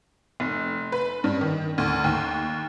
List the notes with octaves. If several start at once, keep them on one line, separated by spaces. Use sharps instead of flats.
F1
B4
G2
D#3
D2
D#2